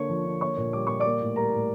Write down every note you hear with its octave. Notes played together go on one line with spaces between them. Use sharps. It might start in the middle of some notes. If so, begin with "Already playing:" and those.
Already playing: D3 A#3 C#5 C#6
F3
D3
A#3 C#5 C#6
A#2
G3 D6
A#2 C#6
A#3 D5 D6
A2
G3 A#4 A#5
A2